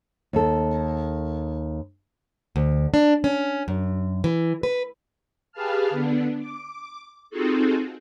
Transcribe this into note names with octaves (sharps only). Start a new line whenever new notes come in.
D#2 A4
D2
D4
C#4
F#2
E3
B4
G4 G#4 B4 F5 A5 F6
D3 B3 D4
D6
C4 D#4 F4 F#4 G#4 A4